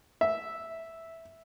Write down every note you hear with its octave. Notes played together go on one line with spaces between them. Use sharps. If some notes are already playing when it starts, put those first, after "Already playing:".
E5